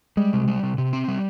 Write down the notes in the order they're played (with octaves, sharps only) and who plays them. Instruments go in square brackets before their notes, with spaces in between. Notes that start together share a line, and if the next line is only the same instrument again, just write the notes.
[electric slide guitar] G3 [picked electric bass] G#3
[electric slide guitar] C3
G3
C3
C3
C4
G3